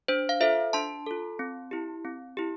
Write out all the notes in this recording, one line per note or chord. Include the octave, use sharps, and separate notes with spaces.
D4 C5
F5
F4 A4 C5 E5
D4 A5 C6
F4 A4
C4
E4 G4
C4
E4 G4